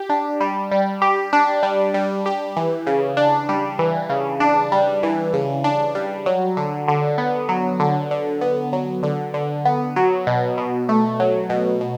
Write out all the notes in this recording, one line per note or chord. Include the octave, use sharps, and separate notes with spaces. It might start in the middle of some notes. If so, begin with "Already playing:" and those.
Already playing: G4
D4
G3
G3
G4
D4
G3
G3
G4
E3
C#3
D4
G3
E3
C#3
D4
G3
E3
C#3
D4
G3
F#3
D3
D3
B3
F#3
D3
D3
B3
F#3
D3
D3
B3
F#3
B2
B2
A3
F#3
B2
B2